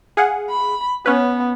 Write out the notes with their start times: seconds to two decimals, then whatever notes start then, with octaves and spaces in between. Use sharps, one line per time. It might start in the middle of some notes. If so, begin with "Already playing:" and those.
0.17 G#4 F5 F#5
0.50 B5
1.06 B3 C#4 B4